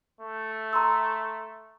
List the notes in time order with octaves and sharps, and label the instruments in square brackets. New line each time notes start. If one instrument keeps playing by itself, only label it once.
[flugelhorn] A3
[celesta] A#5 C6 E6